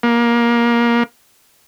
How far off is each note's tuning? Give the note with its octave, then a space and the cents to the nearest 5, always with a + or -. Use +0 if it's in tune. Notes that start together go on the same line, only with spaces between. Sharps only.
A#3 +20